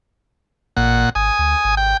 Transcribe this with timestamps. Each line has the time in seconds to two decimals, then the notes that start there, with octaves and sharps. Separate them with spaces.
0.77 A1 A#2 F#5
1.15 G#1 G#5 D#6
1.39 D2
1.64 G#1
1.77 G5